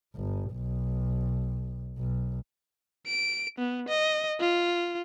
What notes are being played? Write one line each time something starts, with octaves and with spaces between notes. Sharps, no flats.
G1
B1
B1
D7
B3
D#5
F4